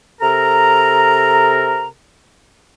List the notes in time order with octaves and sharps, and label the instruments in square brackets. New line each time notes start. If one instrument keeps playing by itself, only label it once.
[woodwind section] C3 A4 A#4 A#5